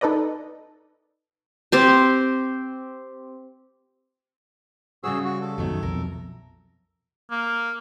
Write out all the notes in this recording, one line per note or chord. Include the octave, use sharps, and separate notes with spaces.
D#4 A4 B4 D5 D#5
C4 G4 C5
C#3 G3 F#4 G#4 C5 E6
F#4
A4
B1 F#2 B2 D#3 F#3 A3
B1 F2 B2 A#4
A#3